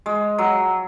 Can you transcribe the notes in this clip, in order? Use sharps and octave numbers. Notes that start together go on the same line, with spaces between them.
G#3
F#3